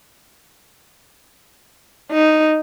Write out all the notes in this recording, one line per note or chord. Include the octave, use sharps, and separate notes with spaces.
D#4